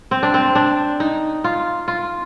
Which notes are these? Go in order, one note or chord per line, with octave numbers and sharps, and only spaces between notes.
C4
D4
C4
D4
D#4
F4
F4